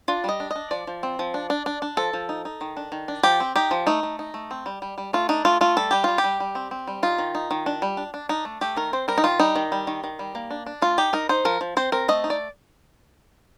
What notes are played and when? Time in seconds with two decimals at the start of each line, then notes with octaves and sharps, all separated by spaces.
0.08 D4 F4
0.24 G3 D#5
0.40 D4
0.51 D4 D#5
0.71 F3 D5
0.87 F3
1.03 C4
1.19 F3
1.34 D4
1.50 D4
1.66 D4
1.82 D4
1.97 F3 A4
2.13 F3
2.29 D#4
2.45 D#4
2.61 D#3
2.77 D4
2.92 D#3
3.08 D4
3.23 F3 G4
3.40 C4
3.56 D#4 G4
3.71 F3
3.87 A3 D#4
4.03 A3
4.19 D#4
4.34 A3
4.51 C4
4.66 G3
4.82 G3
4.98 G3
5.13 A3 F4
5.29 D4 D#4
5.45 A3 F4
5.61 A3 F4
5.77 G3 A4
5.91 G3 G4
6.04 G3 F4
6.18 G4
6.24 G3
6.40 G3
6.55 C4
6.71 C4
6.87 G3
7.03 D#4 F4
7.18 D#3
7.35 D#4
7.51 D#3
7.66 D4
7.82 G3
7.97 D4
8.14 D4
8.29 D4 D#4
8.45 A3
8.61 A3 G4
8.77 D#3 A#4
8.93 C4 C5
9.08 G3 A#4
9.18 D#4
9.24 D#3 F4
9.39 G3 D#4
9.56 D#3
9.72 G3
9.87 D#3
10.04 D#3
10.19 G3
10.35 A#3
10.50 D4
10.66 D4
10.82 A3 F4
10.98 D#4 G4
11.13 D#4 A#4
11.29 D#4 C5
11.45 F3 A#4
11.61 F3
11.77 C4 C5
11.92 C4 A#4
12.08 A3 D#5
12.24 D#4
12.30 D5